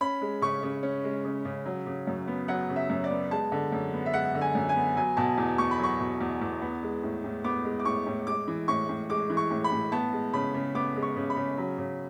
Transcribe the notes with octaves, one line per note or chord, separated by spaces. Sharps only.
C#4 B5
G#3
C#3 C#6
C#3
C#4
G#3
C#3
C#3
F#3
C#3
F#2
B3
F#3 F#5
C#3
E5
F#2
D5
B3
G#3 A5
D3
F#2
B3
E5
G#3 F#5
D3
G#5
F#2
G#5
B3
F#3 G#5
B2 A5
E2
E2 C#6
B5
F#3 C#6
B2
E2
E2
B3
G#3
A2
A2
B3 D6
G#3
D6
A2 C#6
A2
G#3 D6
E3
A2 C#6
A2
G#3 D6
E3
C#6
A2
B5
A2
B3 A5
G#3
C#3 B5
C#3
B3 D6
G#3
C#6
C#3
B5
C#3
F#3
C#3